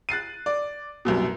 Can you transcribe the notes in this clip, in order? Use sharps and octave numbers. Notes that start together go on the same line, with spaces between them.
F#6 A6 C7 D#7
D5
C2 F#2 B2